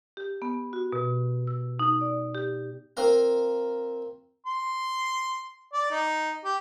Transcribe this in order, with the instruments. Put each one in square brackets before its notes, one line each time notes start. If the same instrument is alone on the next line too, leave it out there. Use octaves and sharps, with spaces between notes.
[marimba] G4
B3
F#4
B2
E6
D#4
D5
G4
[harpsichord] C4 F4 A#4 F5 A#5
[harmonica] C6
D5
D#4
G4